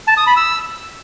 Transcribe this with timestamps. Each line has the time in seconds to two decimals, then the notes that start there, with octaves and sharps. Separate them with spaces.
0.07 A5
0.17 D#6
0.27 B5
0.37 E6